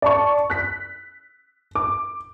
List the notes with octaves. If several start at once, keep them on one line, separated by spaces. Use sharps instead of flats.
D5 A5 C#6
F#6 B6
D6